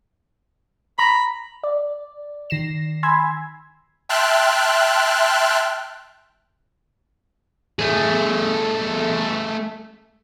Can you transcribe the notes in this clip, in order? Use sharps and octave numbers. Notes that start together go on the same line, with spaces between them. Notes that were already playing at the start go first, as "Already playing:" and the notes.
A#5 B5
D5
D#3 A#6 C7 E7
G#5 B5 C6 E6 G#6
E5 G5 A5 C6 F6 F#6
A3 G#4